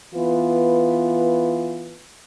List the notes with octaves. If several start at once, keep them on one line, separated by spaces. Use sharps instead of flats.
E3 B3 F4 B4